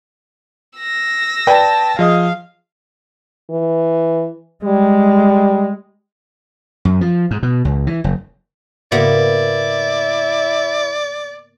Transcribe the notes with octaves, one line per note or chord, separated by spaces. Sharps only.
E6 A#6
B4 D5 G5 A5
F3 G#4 D#5 F5 D#6
E3
G3 G#3
F#2
F3
G#2
B2
C#2
E3
F#1
G#2 C#3 A#3 B3 E4 D5